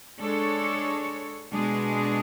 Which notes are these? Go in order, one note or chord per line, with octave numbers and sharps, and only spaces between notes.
G#3 D4 A4 C#5
B2 G#3 D4 G#4